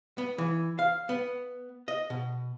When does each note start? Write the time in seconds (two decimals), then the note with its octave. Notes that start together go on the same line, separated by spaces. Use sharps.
0.18 B3
0.38 E3
0.79 F5
1.09 B3
1.88 D#5
2.10 B2